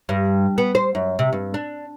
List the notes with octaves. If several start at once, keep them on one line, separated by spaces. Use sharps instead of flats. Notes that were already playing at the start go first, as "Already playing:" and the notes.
G2
B3
C5
F#2
C3
G2
D4